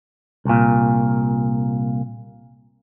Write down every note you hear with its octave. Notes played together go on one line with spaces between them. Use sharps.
C2 A#2